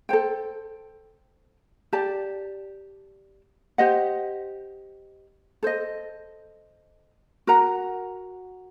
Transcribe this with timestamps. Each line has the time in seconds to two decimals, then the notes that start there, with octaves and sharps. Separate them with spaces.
0.09 A4 C5 G5
1.93 G4 D5 A5
3.78 G4 C5 D#5 F#5
5.63 A4 C5 D#5
7.47 F#4 A#4 F#5 A#5